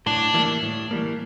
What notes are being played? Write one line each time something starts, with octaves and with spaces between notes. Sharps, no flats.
A2 D4
E3 G3 A#3
A2
E3 G3 A#3